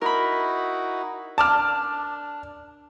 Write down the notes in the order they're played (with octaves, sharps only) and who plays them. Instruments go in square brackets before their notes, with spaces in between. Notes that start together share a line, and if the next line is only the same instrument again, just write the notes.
[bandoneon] D#4 E4 F#4 [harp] A#4 B5
[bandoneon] D4 [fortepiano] A5 D6 F6